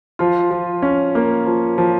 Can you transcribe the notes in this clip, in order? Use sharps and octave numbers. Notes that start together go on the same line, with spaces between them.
F3 F4
F3
C#4
A#3
F3
F3